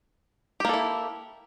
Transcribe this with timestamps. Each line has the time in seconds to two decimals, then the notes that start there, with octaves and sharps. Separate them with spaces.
0.60 G4
0.65 A#3
0.69 A4
0.74 E4